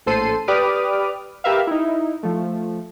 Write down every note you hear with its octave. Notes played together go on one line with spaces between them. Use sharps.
A#1 A2 A4 C5 C7 D#7
G4 B4 D5 D6 D#6 F6
G4 A#4 B4 E5 F5
D#4 E4
F3 A3